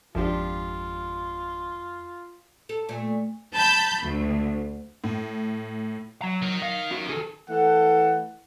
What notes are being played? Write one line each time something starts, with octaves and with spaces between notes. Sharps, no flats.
G#1 F2 F3 D4 F4 G4
A4
A#2 A3
A5 B5 G6
D2
A2
F#3 A#5
D#3
F5
C#4 F#4
G#4 A4
E3 A3 A4 F#5